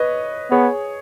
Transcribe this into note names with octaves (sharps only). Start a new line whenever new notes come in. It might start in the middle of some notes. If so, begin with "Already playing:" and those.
Already playing: B4 C#5 D#5
B3 G#4 C#5